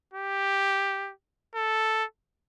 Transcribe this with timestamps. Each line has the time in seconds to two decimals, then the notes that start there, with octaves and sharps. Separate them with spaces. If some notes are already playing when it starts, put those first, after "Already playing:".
0.13 G4
1.55 A4